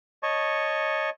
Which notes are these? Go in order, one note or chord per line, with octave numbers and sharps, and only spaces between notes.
C#5 D#5 A5 C#6